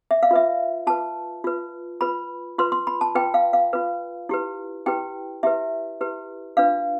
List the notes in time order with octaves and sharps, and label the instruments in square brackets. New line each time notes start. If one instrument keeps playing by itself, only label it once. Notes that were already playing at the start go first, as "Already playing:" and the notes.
[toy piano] E5
F5
F4 B4 E5
F4 B4 A5
F4 B4
F4 B4 B5
F4 B4 C6
C6
B5
A5
F4 B4 G5
F5
F5
F4 B4
E4 G4 B4
E4 G4 B4 G5
E4 G4 B4 E5
E4 G4 B4
D4 F4 B4 F5